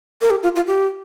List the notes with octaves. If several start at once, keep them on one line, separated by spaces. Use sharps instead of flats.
A#4
G4
F4
F4
G4